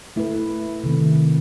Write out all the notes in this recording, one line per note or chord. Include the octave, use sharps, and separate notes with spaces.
A3 E4 B4
C3 D#3 A3 C4